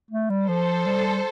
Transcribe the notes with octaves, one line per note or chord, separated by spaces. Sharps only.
A3
G3
F3 A4 C5
G3